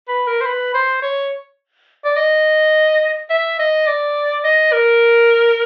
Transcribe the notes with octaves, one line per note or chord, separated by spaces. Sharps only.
B4
A#4
C5
B4
C5
C#5
D5
D#5
E5
D#5
D5
D#5
A#4